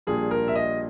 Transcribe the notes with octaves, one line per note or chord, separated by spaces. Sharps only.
A#1 A#2 G3 G#4
A#4
E5
D#5